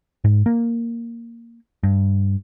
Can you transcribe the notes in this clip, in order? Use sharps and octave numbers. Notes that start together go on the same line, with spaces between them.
G#2
A#3
G2